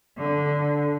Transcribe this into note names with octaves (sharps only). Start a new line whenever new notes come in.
D3